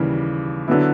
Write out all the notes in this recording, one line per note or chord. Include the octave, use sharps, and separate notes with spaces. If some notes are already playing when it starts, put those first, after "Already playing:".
Already playing: D#2 C#3 E3 G3
D3 F#3 B3 E4